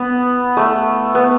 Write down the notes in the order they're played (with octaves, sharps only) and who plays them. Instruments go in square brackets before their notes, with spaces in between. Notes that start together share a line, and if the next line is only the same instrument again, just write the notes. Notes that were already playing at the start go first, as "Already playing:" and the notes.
Already playing: [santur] B3
A3
B3